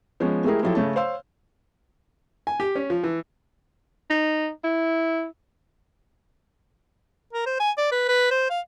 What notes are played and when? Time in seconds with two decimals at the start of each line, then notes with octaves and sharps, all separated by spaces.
0.20 F3 G#3 B3 C#4
0.44 G#3 A3 E4 G4 G#4 A#4
0.63 F3 F#3 E4 G4 A4
0.75 C#3 A3 C#4 A5
0.96 C5 C#5 F5 C6 E6
2.47 G#5
2.60 G4
2.76 C#4
2.90 F3
3.04 E3
4.10 D#4
4.64 E4
7.33 A#4
7.46 C5
7.60 G#5
7.78 D5
7.92 B4
8.09 B4
8.31 C5
8.50 F5